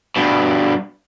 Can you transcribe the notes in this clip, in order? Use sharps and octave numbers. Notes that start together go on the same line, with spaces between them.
G2 B2